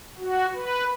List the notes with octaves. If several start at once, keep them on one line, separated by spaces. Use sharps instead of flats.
F#4
B4